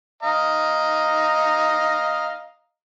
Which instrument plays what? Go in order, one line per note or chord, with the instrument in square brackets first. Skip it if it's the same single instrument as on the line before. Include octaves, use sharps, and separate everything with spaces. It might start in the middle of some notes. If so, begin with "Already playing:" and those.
[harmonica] D#5 F5 A#5